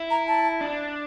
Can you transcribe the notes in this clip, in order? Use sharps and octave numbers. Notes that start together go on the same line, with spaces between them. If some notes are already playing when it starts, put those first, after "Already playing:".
Already playing: E4
A#5
A5
D4